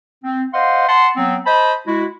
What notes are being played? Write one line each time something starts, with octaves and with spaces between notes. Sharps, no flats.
C4
C5 D#5 F5 F#5 C6
F#5 A5 C6
F#3 B3 C4
C5 D#5 A5 B5
G#3 E4 F#4